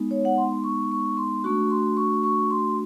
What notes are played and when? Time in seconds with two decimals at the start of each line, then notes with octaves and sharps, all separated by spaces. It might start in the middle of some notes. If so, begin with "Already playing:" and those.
Already playing: G#3 B3 D#4
0.11 C#5
0.25 F#5
0.38 C6
0.64 C#6
0.92 C#6
1.17 C6
1.44 A3 D4 F#4 C#6
1.70 C6
1.97 C#6
2.24 C#6
2.51 C6